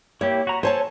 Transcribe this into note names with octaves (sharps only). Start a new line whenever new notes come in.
A#3 E4 G4 C#5
F#4 A#5
A4 C5 C#5 G#5 A5